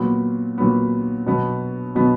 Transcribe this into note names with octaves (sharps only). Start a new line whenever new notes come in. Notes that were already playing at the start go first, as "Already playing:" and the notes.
Already playing: A#2 F#3 B3
A#2 F#3 B3
B2 F#3 B3
B2 F#3 B3